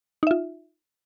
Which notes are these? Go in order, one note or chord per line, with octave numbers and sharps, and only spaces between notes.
D#4 F4 E5